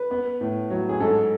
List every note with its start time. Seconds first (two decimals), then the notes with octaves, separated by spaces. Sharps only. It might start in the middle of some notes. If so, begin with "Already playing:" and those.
Already playing: B4
0.11 B3
0.41 A2
0.70 F#3
0.89 G#4
1.00 G#2 A4